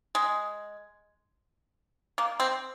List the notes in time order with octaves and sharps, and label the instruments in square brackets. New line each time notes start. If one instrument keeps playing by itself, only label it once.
[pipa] G#3
A#3
C4